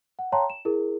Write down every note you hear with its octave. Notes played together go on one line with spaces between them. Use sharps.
F#5
C#5 F5 G5 A5 A#5 C6
E7
E4 G#4 A#4